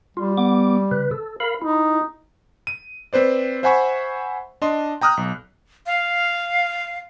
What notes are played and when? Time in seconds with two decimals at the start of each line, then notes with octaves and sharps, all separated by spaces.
0.17 G3 F4
0.38 B3 D6
0.91 C#3 B4
1.11 A4
1.40 A#4 F5 B5
1.62 D#4 E4
2.67 D#7
3.13 C4 B4 C5 D5
3.63 C5 E5 F#5 G#5 B5 C#6
4.62 D4 D#5 C6
5.01 G5 A#5 D#6 F6 F#6
5.17 B1
5.86 F5